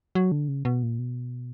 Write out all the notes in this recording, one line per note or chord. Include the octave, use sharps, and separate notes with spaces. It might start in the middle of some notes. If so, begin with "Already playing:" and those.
F#3
D3
C#3
B2
A#2
B2